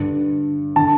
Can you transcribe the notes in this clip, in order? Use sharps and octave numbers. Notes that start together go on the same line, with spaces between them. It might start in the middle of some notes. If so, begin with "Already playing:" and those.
Already playing: G2 D3
D3 A5